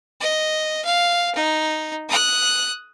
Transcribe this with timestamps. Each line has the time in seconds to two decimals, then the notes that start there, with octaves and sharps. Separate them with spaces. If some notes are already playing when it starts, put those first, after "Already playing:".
0.20 D#5
0.85 F5
1.35 D#4
2.09 D#6 F#6